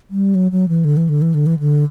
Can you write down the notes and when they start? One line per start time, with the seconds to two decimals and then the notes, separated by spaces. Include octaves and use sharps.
0.10 G3
0.35 F#3
0.51 F#3
0.68 E3
0.84 D3
0.97 E3
1.09 D3
1.22 E3
1.34 D3
1.46 E3
1.59 D3